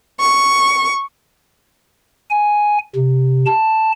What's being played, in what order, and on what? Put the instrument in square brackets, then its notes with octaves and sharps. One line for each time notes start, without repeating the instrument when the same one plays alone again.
[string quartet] C#6
[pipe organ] G#5
C3
A5